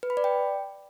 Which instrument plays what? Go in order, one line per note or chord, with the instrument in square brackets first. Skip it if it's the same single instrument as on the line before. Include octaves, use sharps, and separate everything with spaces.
[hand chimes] B4
B5
D5
G5